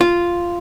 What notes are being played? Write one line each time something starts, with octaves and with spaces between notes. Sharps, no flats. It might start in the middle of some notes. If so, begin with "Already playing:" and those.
F4